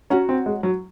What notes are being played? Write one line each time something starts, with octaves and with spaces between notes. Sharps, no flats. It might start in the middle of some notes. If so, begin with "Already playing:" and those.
C#4 F#4 C#5 F#5 A#5
C4
G#3
F#3